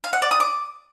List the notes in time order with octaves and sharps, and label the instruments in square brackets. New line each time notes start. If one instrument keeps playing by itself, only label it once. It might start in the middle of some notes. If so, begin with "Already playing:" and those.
[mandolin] F5
F#5
D5
D#6
D6